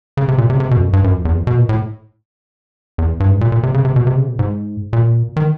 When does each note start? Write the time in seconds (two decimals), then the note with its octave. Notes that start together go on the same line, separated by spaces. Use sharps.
0.17 C#3
0.28 C3
0.38 A#2
0.50 C3
0.55 C#3
0.60 C3
0.71 B2
0.77 F2
0.81 F#2
0.93 G2
1.04 F#2
1.14 F2
1.25 E2
1.35 F2
1.47 B2
1.58 A#2
1.69 A2
2.98 E2
3.20 G2
3.30 G#2
3.41 A#2
3.52 A#2
3.63 C3
3.74 C#3
3.85 C3
3.96 B2
4.07 C3
4.17 C#3
4.28 B2
4.39 G#2
4.93 A#2
5.36 D#3